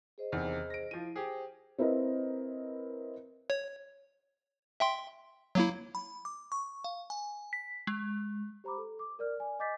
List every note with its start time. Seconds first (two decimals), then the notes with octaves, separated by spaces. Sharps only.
0.18 G#4 C5 D#5
0.32 E2 C3 D#3
0.70 A#6 D7
0.91 F3 E4 D#7
1.16 G4 G#4 C5
1.79 C4 E4 A#4 B4 D#5
3.50 C#5
4.80 E5 G5 C6
5.55 F#3 A#3 E4
5.95 B5
6.25 D6
6.52 C#6
6.84 F5
7.10 G#5
7.53 B6
7.87 G#3
8.64 G4 C5 A#5 B5 D6
8.78 A4
8.99 D6
9.19 A#4 D5 F6
9.37 D5 G#5
9.59 D#5 G#5 D6 G6 A6 B6